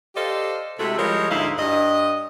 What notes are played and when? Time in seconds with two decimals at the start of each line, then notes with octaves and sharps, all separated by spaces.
0.15 G4 A4 C5 D5 D#5 F5
0.79 C3 G#3 A3 E4 F#4 A4
0.98 F3 G3 G#3 F#4 A#4 C#5
1.30 D2 G#2 E4 D#5 F5
1.58 G2 D#5